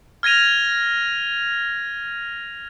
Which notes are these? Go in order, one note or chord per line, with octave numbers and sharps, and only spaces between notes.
F6 G#6 A#6 D#7 F7